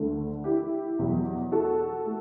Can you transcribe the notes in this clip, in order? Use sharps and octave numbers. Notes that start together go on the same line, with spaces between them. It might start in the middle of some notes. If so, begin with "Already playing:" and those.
Already playing: D2 D3 A3
E4 G4
E2 B2 F#3
F#4 A4
A3